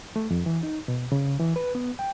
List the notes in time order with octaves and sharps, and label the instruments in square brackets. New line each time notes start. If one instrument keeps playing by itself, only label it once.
[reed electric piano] A3
F2
E3
D#4
B2
C#3
E3
B4
B3
G5